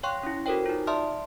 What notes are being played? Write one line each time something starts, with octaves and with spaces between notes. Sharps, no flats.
C#5 F5 G5 C6 C#6 F#6
C#4 E4
F#4 A4 A#4 C5 C#5 G5
D#4 F4
D5 E5 A5 C6 D#6 F6